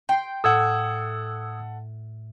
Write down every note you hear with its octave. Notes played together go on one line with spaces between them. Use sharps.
G5 C6 C7
A2 A4 F#5 D#6 E6 G#6